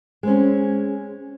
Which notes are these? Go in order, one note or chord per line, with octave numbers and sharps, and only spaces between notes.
G#3 C4 C#4